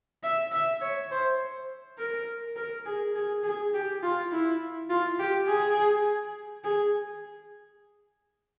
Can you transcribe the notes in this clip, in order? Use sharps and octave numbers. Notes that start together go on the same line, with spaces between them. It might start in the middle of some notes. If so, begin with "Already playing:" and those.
E5
E5
C#5
C5
A#4
A#4
G#4
G#4
G#4
G4
F4
E4
F4
G4
G#4
G#4